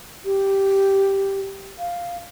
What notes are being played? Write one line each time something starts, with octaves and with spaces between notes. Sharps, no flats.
G4
F5